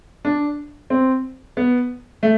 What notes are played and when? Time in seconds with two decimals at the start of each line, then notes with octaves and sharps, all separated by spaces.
0.25 D4
0.90 C4
1.57 B3
2.23 A3